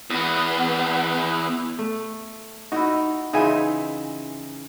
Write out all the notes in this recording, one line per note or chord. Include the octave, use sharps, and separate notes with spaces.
E2 B3
A3
D#4 E4 F#4
C#3 E3 C4 D#4 E5 G#5